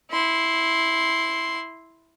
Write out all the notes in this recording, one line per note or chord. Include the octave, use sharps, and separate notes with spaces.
E4 C6